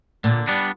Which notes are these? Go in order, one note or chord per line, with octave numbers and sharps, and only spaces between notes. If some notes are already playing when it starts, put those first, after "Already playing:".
A#2 D3
G3 B3 D4